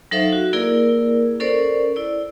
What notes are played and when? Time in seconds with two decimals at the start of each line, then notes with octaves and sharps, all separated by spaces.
0.11 F#3 D#4 A4 C5 E5 F5
0.32 F#4
0.53 A#3 E4 G#4 A#4 D5
1.40 C#4 A4 A#4 C5 D5
1.96 E4 D5